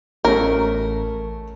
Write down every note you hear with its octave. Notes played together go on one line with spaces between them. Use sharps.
A1 A3 C#4 A#4